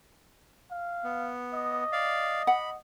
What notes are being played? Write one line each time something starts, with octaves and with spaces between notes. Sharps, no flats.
F5
B3
D#5
D5 F5
F#5 B5